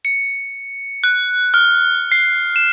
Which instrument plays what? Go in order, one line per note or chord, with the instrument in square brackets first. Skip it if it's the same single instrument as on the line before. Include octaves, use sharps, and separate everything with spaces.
[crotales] C#7
F#6
F6
C7
E7